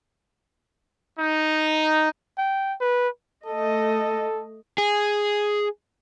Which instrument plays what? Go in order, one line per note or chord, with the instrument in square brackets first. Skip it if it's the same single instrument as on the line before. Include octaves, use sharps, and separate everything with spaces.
[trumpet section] D#4
[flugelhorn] G5
B4
[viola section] A3 D#5 [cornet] A4
[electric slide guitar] G#4